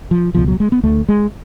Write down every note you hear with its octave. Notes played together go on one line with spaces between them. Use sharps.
F3
C#2 B2 F3
F#3
G#3
B3
D2 D3 A3
G#3